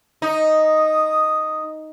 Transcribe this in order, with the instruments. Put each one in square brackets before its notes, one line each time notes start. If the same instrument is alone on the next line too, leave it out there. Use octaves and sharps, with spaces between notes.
[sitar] D#4 [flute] D#6